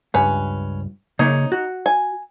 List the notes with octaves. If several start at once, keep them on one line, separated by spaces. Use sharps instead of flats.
C#2 G2 C#4 B4
C#3 A#3 D#4 C#5
F#4
G#5